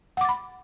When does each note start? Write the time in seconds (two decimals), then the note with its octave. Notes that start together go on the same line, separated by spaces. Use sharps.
0.17 F#5
0.21 D6
0.25 A6
0.29 B5